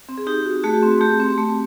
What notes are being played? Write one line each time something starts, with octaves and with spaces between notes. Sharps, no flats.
C4
G#4
D#4 G4
F#4
A3 F#4 G#4
C4
A3 G4
C4
A3